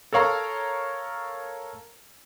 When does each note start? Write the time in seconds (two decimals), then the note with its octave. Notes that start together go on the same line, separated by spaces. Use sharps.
0.13 A4 A#4 C#5 F5 A#5